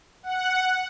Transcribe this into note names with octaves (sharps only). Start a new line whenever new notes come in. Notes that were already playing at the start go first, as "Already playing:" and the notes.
F#5